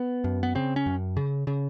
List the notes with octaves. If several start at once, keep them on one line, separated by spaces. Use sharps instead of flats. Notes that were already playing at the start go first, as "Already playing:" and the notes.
Already playing: B3
F#2
B3
C#3 C4
C#4
F#2
C#3
C#3